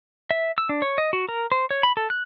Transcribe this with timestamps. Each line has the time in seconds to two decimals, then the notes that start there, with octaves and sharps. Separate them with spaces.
0.31 E5
0.58 E6
0.69 D4
0.82 C#5
0.98 D#5
1.13 F#4
1.29 A#4
1.52 C5
1.71 C#5
1.83 B5
1.97 A4
2.10 F#6